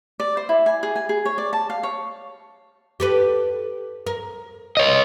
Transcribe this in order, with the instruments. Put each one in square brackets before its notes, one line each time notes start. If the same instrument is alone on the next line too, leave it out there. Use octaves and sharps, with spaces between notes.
[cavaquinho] D5
C5
E4
G#5
G#4
G#5
G#4
C#5
D5
A5
F5
C#5
[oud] G4 A4 B4
A#4
[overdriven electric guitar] C#5 D#5